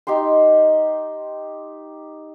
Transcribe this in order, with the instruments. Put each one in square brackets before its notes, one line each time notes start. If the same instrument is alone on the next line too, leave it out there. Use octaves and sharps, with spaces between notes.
[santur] D#4 G4 G5 C6